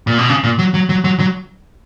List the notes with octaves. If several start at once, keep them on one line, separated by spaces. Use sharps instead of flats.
A#2
B2
C#3
A#2
F#3
F#3
F#3
F#3
F#3